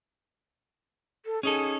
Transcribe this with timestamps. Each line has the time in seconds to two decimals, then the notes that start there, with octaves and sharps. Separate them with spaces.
1.25 A4
1.43 C#4 D#4 G#4 A4